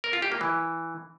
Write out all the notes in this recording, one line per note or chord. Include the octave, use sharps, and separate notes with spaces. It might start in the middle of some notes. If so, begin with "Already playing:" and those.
A#4
F4
G4
A#3
E3